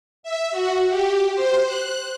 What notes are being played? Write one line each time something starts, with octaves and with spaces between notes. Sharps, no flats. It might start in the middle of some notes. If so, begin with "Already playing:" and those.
E5
F#4
G4
C5
F#6